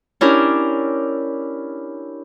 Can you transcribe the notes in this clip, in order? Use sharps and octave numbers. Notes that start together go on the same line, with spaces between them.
C#4 D4 E4 G4 A#4